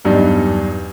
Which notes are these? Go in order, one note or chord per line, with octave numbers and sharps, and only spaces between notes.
E2 G2 F#3 D4 D#4